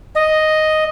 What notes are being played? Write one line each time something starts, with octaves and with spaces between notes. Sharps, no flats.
D#5